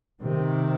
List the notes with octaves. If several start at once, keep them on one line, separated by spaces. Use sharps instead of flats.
C3 D#3